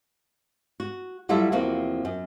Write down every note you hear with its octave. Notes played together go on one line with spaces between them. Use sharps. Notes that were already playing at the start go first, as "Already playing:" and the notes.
F#4
F#3 G3 E4 F4 A4 E5
E2 C3 F3 A#3 C4 F#4
F#2